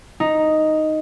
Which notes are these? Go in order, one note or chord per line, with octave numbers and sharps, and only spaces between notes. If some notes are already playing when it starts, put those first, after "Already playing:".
D#4